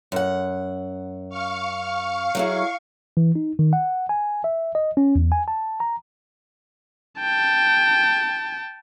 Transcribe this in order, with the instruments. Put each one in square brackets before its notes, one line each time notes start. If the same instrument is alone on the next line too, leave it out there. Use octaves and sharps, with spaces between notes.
[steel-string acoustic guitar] F#2 F#5
[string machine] F5 C#6
[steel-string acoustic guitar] F#3 E4 G#4
[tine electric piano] E3
D#4
D#3
F#5
G#5
E5
D#5
C#4
E2
G#5
A5
A#5
[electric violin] G5 A5